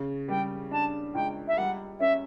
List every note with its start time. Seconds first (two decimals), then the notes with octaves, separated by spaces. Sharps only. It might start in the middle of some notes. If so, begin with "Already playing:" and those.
Already playing: C#3
0.28 G3 G5
0.71 D4 A5
1.15 C#2 G5
1.48 E5
1.57 G3 F#5
2.00 C#4 E5